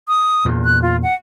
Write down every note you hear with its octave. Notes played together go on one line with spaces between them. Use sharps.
D#6
E2 A#2
F#6
F4
F#5